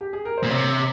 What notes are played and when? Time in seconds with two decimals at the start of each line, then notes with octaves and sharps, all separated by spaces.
0.01 G4
0.13 G#4
0.25 A#4
0.37 C5
0.43 A#2
0.50 C3 C#5